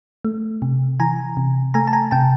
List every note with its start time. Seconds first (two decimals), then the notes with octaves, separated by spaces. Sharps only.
0.25 A3
0.62 C3
1.00 E3 G#5 A#5
1.37 C3
1.74 A3 G#5 A#5
1.87 A5
1.93 G#5 A#5
2.11 C3 G5 A5